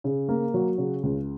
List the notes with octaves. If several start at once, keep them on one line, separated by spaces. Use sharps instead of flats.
C#3
A#3
F#3
C#3
C#2